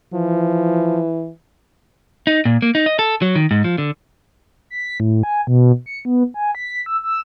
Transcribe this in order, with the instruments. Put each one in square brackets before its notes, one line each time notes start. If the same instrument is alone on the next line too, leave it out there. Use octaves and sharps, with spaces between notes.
[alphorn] E3 [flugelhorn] F3
[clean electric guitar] D#4
A#2
A#3
D#4
D#5
A4
F#3
D#3
G#2
F3
D3
[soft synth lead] B6
A2
G#5
B2
C#7
B3
G#5
B6
E6
E6